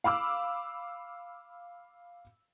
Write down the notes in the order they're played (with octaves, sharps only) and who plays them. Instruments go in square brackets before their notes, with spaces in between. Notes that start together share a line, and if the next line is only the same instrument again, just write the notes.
[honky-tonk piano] F5 B5 D6 E6